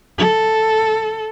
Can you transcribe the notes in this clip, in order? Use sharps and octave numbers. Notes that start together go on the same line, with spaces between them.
A4